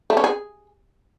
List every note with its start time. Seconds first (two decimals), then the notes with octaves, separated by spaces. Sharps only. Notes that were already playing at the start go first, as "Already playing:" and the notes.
0.10 A3
0.17 C#4
0.24 G#4